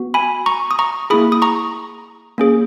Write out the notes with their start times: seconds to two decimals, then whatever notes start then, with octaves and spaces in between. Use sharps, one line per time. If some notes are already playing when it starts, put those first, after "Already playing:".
Already playing: B3 F#4
0.14 G#5 B5
0.46 A#5 C#6
0.71 D#6
0.79 A#5 C#6
1.10 A#3 E4 G#4 B5 D#6
1.32 D#6
1.42 A#5 C#6
2.38 A#3 C#4 G#4